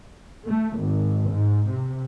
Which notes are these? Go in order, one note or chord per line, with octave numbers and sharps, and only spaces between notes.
A3
G#1
G#2
C3